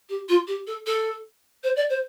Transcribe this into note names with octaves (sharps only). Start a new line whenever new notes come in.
G4
F4
G4
A4
A4
C5
D5
C5